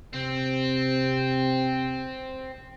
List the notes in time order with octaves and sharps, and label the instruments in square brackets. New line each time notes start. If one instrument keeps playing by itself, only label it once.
[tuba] C3 [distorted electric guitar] C4